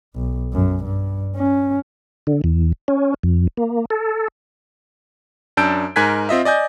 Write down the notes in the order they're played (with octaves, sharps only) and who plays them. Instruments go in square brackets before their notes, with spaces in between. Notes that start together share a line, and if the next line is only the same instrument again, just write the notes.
[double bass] B1
F#2
G2
C#4
[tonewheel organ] D3
E2
C#4
F2
A#3
A4
[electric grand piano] F#2 D4 A5 E6 G6 D7
G#2 A#4 G#5 F#6 G#6 B6
C4 F4 D#5 E5
D5 D#5 G#5 G6